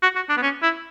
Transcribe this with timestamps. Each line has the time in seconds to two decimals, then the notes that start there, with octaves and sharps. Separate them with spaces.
0.03 F#4
0.16 F#4
0.29 D4
0.37 B3
0.42 C#4
0.63 E4